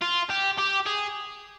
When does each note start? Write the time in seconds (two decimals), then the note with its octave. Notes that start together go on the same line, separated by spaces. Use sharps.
0.01 F4
0.30 G4
0.58 G4
0.86 G#4